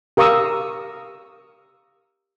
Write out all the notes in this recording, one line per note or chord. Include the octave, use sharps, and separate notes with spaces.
G4 A#4 F5 C#6 D#6 E6